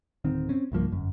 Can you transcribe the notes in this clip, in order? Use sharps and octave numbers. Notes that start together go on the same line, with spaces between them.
D1 D#3 C4
C4 C#4
C2 G2 F3 A#3
G1 F#2